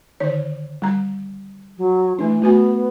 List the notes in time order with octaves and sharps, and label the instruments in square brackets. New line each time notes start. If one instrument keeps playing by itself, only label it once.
[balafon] D3 D#3 C#5
G3 A#5
[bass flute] F#3
[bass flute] E3 [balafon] A3 D4
[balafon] A3 F#4 G#5 [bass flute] B3